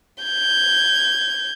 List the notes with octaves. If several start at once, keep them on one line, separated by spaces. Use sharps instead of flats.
G6 G#6